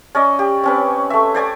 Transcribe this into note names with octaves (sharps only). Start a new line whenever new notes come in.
C#4 D5 D#5
G4
C4 C#4 B4
A3 E5
C5 D5 G#5